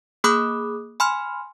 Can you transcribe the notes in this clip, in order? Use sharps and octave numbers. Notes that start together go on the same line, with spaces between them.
A#3 G#4 B5 D6 D#6 F#6
G#5 B5 C6 F6